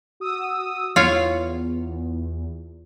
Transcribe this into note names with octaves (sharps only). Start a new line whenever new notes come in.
F#4 D#6 E6
E2 F4 C#5 F5